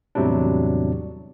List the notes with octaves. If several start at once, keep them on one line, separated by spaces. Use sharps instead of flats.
E2 A2 C3 F#3 G3 D4